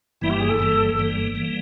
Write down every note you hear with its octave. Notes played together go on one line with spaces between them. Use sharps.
G1 G2 E3 G3 A#3 E4
G4
G#4
A4
G1 G2 E3 G3 A#3
G1 G2 E3 G3 A#3
E3 G3 A#3